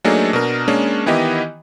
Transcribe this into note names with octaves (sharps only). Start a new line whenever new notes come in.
F#3 A3 A#3 D4 D#4 G#4
B2 D4 A#4
G#3 A#3 C#4 D4
D#3 E3 B3 E4 G4 D#5